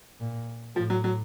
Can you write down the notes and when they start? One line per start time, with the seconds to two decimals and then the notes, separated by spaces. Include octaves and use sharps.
0.21 A#2
0.75 A2 F3
0.90 F#3
1.04 F#3